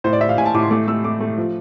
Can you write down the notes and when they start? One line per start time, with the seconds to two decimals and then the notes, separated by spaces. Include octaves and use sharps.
0.04 A2 C5
0.13 D5
0.21 A2 E5
0.29 F5
0.38 A2 G#5
0.46 A5
0.54 A2 D6
0.63 C6
0.71 A3 D6
0.87 A3 E6
1.04 A3 D6
1.20 A3
1.38 F3